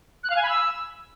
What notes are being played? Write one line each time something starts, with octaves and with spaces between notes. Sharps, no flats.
F#6
F5
G#5
B5
E6